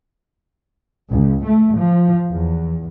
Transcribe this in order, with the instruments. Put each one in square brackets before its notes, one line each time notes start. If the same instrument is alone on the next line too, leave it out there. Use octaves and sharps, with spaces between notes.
[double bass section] C#2
A3
F3
E2